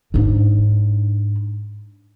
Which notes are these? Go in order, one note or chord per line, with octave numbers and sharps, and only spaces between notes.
G#2 D4